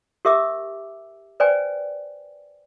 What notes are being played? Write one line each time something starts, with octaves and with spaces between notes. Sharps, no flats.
G4 A#4 E5 D6 E6
B4 C5 D5 G5 G#5